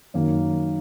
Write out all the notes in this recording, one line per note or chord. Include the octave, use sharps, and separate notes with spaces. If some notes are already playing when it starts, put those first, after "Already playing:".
F#2 D#3 A#3